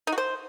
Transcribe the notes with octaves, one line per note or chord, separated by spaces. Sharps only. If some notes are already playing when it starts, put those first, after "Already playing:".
D#4
F#4
C5